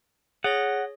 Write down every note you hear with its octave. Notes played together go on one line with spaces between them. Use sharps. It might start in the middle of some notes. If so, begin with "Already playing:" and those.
G#4 C#5 F#5 A#6